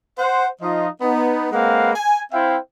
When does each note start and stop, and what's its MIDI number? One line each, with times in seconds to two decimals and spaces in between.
0.19 0.48 72
0.19 0.48 78
0.62 0.88 53
0.62 0.88 63
0.62 0.88 65
0.62 0.88 75
1.02 1.48 59
1.02 1.48 63
1.52 1.90 56
1.52 1.90 58
1.52 1.90 60
1.52 1.90 71
1.52 1.90 77
1.52 1.90 78
1.95 2.23 80
2.32 2.57 60
2.32 2.57 64
2.32 2.57 72
2.32 2.57 76
2.32 2.57 77
2.32 2.57 79